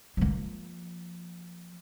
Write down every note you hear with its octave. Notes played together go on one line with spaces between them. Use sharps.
F3 A#3